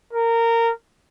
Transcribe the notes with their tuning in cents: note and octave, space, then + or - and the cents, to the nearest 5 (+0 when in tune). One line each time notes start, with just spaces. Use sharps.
A#4 -20